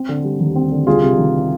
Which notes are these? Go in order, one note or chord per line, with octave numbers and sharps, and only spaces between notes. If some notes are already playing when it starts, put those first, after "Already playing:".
Already playing: C4
D3
G3
D#2
C4
D3
C2 F4 G#4
C3
D#3